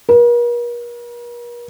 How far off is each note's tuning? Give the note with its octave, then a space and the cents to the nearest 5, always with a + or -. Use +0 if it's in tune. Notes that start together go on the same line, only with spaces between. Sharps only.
A#4 +45